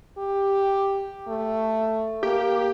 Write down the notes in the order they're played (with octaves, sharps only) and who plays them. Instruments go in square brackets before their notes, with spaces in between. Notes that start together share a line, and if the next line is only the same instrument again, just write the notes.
[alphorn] G4
A3
[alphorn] A#3 [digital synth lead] G4